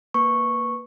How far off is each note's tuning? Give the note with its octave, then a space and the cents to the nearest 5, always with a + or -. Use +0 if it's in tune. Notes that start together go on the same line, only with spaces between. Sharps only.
A#3 +0 B4 +0 C#6 -5